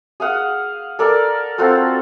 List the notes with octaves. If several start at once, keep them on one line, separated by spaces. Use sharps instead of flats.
G#4 F5 F#5
A4 A#4 D5
C4 F4 F#4 A4